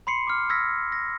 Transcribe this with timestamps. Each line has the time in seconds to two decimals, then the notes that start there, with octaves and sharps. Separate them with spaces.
0.07 B5 C6 C7 C#7
0.27 D6 F6
0.50 E6 F6 G#6 A#6 B6
0.92 A#6